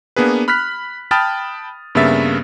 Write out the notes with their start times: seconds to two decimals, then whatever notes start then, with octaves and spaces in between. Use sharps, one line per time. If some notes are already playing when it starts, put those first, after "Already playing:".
0.16 A#3 B3 D4 G#4 B4
0.48 B5 F6 F#6 B6
1.11 G5 A5 B5 D#6 F6 A6
1.95 G2 C#3 A#3 B3 E5 A6